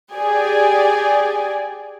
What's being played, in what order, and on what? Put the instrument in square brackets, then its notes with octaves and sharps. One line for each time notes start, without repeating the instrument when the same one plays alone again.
[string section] G4 G#4 D5 G#5